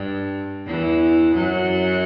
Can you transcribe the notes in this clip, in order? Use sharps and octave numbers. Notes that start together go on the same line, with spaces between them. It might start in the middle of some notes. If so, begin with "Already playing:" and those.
Already playing: G2
E2 E3
F#2 F#3